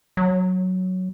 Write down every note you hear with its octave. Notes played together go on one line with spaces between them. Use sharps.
F#3